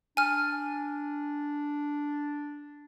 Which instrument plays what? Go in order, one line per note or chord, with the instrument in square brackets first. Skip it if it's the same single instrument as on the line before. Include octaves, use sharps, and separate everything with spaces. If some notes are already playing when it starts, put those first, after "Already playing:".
[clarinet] D4 [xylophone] G#5 F6